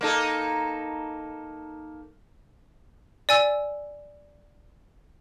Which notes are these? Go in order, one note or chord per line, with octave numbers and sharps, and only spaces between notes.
A#3 D#4 A4
D5 G#5 E6